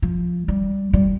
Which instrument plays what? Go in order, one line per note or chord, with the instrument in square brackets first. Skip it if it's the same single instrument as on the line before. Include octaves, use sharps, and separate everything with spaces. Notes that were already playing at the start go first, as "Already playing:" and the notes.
[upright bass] F3
G3
G3